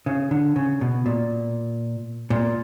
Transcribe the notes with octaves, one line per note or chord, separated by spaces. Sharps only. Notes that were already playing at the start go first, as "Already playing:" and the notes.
C#3
D3
C#3
B2
A#2
A#2